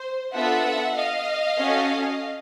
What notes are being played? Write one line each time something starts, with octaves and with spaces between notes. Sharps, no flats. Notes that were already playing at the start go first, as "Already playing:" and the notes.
Already playing: C5
B3 D4 F4 A4 E5 F#5
D#5 F5
C#4 F#4 A4